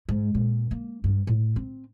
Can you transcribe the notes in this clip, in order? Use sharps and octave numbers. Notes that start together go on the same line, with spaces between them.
G#2
A#2
A#3
G2
A2
C4